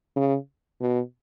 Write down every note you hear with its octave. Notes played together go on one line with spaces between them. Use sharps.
C#3
B2